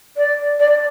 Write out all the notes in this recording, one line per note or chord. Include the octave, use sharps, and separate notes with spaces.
D5
D5